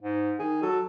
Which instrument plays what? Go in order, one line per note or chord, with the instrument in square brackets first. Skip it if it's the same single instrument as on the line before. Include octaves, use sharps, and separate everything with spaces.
[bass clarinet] G#2
[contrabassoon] D#3 [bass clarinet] G#4
[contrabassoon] F#3 [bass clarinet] A4